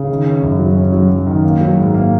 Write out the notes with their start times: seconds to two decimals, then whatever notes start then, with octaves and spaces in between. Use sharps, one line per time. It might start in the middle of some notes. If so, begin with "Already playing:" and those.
Already playing: C#3
0.09 D#3
0.26 C#4
0.42 F#2
0.59 F#3
0.76 C#4
0.93 F#3
1.09 F#3
1.27 D#3
1.44 A#3
1.61 F#3
1.78 G#2
1.94 A#3